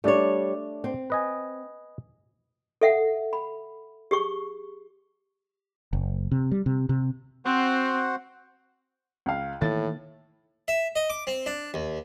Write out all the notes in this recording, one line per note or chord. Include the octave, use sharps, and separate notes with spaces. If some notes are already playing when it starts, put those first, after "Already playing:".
G3 A3 D4 C#5 D5
C4
B4 D#5 G#5
A4 E5 F#5
B5
G4 G#4 C#6
F#1
C3
G3
C3
C3
C4 F#4 C5 F#5
C#2 F5
A2 D#3 E3 A#3 A6
E5
D#5
D6
C4
D4
D#2